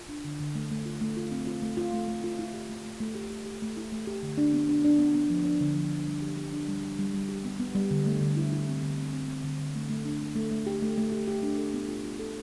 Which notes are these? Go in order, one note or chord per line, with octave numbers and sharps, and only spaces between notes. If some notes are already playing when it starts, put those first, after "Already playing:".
Already playing: F4
D4
D3
D3
A3
A3
F4
A3
F4
C4
F4
A3
F4
A3
A3
F4
E4
G4
A3
A3
A3
G4
G4
G4
A3
E4
A3
G4
D3
D4
B3
D4
D4
B3
B3
F3
D4
D3
F3
F3
G3
G4
G4
D4
G3
G3
G3
G3
G4
B3
B3
G3
D3
A3
D3
E4
E4
C4
D3
C4
C4
C4
D3
D3
A3
A3
D4
A3
A3
A3
G4
A3
A3
G4
G4
D4
A4
B3
F4
F4
A4